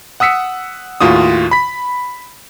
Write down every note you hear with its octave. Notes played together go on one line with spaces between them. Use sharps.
F#5 D#6 E6 B6 C#7
D#2 A2 F4 F#4 D#6
B5 B6